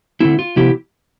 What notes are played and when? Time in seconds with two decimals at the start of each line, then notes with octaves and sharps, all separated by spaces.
0.20 D3 A3 C4 E4
0.39 F4
0.56 C3 F3 B3 E4 G4